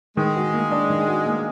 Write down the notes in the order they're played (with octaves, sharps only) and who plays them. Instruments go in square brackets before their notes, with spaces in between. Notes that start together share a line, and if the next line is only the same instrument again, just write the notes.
[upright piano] D#3 [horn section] G#3
[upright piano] F#4
A#3
D4
D#3
F#4
A#3